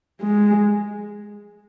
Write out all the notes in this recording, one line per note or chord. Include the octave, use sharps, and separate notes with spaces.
G#3